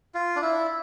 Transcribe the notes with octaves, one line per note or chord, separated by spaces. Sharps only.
F4
D4
E4